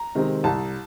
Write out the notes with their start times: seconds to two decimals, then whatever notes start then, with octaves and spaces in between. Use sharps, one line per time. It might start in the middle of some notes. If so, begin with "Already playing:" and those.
Already playing: A#5
0.15 C3 D#3 G#3 C4
0.44 C2 A5